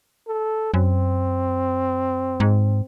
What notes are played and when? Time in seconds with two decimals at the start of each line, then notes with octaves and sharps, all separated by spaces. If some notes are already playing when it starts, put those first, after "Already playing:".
0.27 A4
0.74 F#2 C4
2.40 G#2